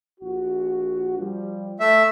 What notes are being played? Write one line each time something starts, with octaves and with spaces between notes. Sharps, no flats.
A#1 F#4
F3 G3
A3 E5